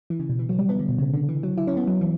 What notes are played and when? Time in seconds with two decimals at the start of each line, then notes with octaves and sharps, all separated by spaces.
0.10 E3
0.19 C#3
0.29 B2
0.39 E3
0.49 F#3
0.59 G3
0.69 B3
0.79 D3
0.89 B2
0.98 C#3
1.14 D3
1.29 E3
1.43 F#3
1.58 E4
1.67 C#4
1.77 B3
1.87 F#3
2.01 E3